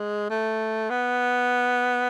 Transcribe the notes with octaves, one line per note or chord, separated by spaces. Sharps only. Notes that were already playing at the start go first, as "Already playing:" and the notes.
Already playing: G#3
A3
B3